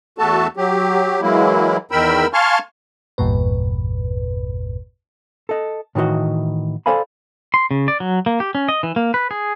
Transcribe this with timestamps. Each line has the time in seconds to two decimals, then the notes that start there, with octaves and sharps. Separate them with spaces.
0.18 E2 A3 F#4 A4 A5
0.57 F#3 G4
1.22 E3 F#3 G#3 A#3 E4
1.91 E2 D#3 A#4 G5 B5 E6
2.33 F5 G#5 A5 C6 C#6 F6
3.18 G#1 E2 G2 A#2 B4
5.49 A4 D#5
5.95 A2 D#3 E3 F#4 D#5
6.86 A4 C5 D5 F5 G#5 B5
7.54 C6
7.71 C#3
7.88 D5
8.00 F#3
8.26 A#3
8.40 G4
8.55 C#4
8.69 D#5
8.83 E3
8.96 A#3
9.14 B4
9.31 G#4